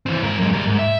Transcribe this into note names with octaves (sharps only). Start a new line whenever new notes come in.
E3 C4
G#2 A#4
F#2 G#3
G3 A#4
G#2
E5